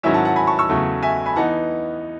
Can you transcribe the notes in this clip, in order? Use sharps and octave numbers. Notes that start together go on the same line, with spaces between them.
G#2 D#3 F#3 C#4 E4 E5 G#5
F#5 A5
F#5 A5
G#5 B5
A5 C#6
C#6 E6
E2 C#3 F#3 A3
E5 G#5
G#5 B5
E3 B3 D#4 F#5 A5